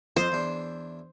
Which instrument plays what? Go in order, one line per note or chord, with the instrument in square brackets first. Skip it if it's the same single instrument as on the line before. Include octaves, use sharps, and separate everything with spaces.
[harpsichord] F2 F4 D#5 [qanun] C5
[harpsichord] E2 D4